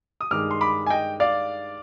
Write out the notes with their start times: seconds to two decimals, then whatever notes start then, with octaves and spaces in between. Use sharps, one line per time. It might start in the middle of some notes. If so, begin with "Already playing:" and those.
0.21 D#6
0.31 G2 D#3 G#3 D6 F6
0.51 C6
0.61 B5 D6
0.86 G#5
0.90 D#5 G5
1.20 D5 F5